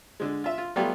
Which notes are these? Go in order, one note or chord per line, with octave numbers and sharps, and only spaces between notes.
D3 G#3
F4 E5
F4
F#3 G3 A3 B3 F4 G4